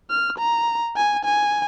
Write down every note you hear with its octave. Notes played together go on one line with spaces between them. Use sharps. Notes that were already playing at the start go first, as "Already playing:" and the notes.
F6
A#5
G#5
G#5